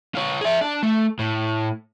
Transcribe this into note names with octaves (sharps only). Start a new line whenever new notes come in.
F4 C#5
G#4 E5
D4
A3
A2